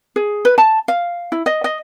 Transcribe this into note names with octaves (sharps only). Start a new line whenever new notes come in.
G#4
B4
A5
F5
E4
D#5
D#5